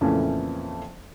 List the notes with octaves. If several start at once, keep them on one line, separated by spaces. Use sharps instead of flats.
F2 A#2 C#3 E3 A3 C#4